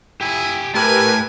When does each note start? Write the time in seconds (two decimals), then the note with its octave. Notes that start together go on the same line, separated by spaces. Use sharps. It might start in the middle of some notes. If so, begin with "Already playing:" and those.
0.21 E4 G4 G#5
0.75 A3 E4 G4 A#4 B4 G#5